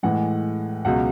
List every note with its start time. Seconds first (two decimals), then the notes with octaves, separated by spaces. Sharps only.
0.03 A2 E3 G#3 F#5
0.85 C#2 B2 F#3 F#5